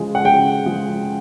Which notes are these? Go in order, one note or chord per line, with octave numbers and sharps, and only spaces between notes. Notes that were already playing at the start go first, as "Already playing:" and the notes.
Already playing: C#3 F3 G#3
F#5
C#3 G5
F3 G#3